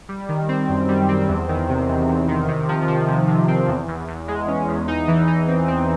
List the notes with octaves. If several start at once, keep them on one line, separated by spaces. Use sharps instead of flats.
G3
D#3
C4
F#2
G3
C4
E2
D#3
C3
E2
E2
D#3
C3
F3
F3
C3
C3
C4
E2
E2
E2
G#3
C#4
E2
D#4
E3
D#4
C4
C4